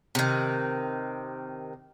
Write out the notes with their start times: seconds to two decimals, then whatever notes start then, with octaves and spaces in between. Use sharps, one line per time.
0.15 C3 D#3